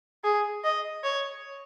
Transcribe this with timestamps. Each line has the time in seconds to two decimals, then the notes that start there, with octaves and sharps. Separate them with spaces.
0.24 G#4
0.64 D#5
1.04 C#5